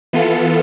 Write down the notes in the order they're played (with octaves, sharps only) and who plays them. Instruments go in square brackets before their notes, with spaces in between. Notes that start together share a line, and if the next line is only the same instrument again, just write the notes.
[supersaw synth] E3 B3 F4 A4